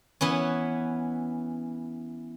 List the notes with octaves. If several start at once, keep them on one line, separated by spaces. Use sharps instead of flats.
E3 B3 C#4